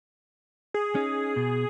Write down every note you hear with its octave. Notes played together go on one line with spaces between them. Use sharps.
G#4
C#4 D#4
B2